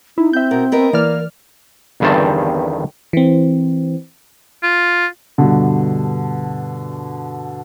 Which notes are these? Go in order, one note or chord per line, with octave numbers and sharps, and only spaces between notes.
D#4 E4
C4 E5 G6
B2 A#4
B3 A#4 D#5
E3 A#3 A#4 D5 F6
G1 E2 G2 D#3 C4 A5
E3 C4
F4
G2 B2 D3